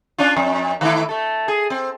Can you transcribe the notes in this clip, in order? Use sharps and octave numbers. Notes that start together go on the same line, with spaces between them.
C#4 D4 F4
F2
D#3 A3 E4
A3 A4
G#4
C4